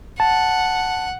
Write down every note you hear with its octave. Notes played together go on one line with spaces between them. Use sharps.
F#5 A5